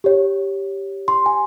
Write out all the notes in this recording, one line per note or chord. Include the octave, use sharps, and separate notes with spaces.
G4 C#5
C6
G#5